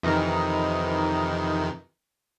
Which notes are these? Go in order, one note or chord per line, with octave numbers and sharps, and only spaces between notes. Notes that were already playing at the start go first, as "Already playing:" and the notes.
F2 C3 D#3 E3 D#4 A#4